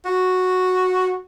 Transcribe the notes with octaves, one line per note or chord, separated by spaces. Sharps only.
F#4